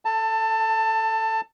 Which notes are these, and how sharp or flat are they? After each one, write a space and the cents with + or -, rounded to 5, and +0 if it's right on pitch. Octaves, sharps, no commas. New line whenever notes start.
A4 +0 A5 +20